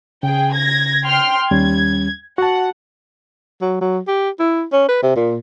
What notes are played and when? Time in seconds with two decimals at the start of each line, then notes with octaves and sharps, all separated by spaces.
0.23 C#3 G#4 G5
0.54 G#6 A#6
1.04 G5 C6 F6
1.51 D#2 G3 C#4 G#6
2.38 F#4 F#5 A5
3.61 F#3
3.81 F#3
4.07 G4
4.40 E4
4.73 C#4
4.88 B4
5.03 C3
5.16 A#2